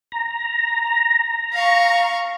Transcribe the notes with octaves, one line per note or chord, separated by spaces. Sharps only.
A#5
F5 C#6